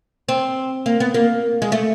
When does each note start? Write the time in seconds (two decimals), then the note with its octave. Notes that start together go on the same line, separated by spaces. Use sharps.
0.29 C4
0.86 A#3
1.00 B3
1.14 A#3
1.62 G#3
1.72 A3